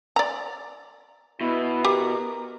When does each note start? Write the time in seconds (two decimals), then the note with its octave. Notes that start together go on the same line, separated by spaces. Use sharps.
0.16 D5 A#5
1.41 B2 E4
1.85 G4 A#4